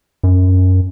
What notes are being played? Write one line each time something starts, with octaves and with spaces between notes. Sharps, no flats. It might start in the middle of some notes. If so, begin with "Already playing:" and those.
F#2